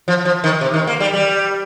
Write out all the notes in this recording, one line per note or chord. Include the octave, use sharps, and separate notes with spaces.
F3
F3
D#3
C3
D#3
A#3
G3
G3